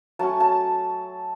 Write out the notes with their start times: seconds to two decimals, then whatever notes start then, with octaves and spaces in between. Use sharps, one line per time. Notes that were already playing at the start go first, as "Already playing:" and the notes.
0.19 F#3 A3 C#4 A5
0.40 A5